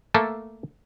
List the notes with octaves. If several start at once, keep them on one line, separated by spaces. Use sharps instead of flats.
A3 A#3 A4